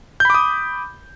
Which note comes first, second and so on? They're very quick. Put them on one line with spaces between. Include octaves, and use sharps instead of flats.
G6 B5 D6 D#6